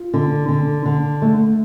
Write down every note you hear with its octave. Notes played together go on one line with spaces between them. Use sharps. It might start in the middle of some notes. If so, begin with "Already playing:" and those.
Already playing: F4
D3
D3
D3
A3